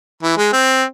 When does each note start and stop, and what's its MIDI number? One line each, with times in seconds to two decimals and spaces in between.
0.23 0.37 52
0.37 0.48 56
0.53 0.84 60